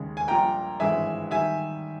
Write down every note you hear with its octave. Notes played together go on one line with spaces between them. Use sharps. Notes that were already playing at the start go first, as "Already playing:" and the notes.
Already playing: D#2 C#3 G#3
G#5
A#1 A#2 G3 G5 A#5
G#1 G2 E3 G#3 E5 G#5
D#3 G3 E5 G#5